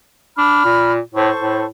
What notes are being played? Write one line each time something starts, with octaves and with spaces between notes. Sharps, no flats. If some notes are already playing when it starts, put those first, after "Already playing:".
D4 B5 F6
A#2
A2 A4 C5 C#6
A2